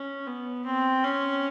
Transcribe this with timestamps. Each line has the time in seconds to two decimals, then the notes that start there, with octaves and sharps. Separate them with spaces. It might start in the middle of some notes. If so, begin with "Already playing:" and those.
Already playing: C#4
0.27 B3
0.65 C4
1.04 C#4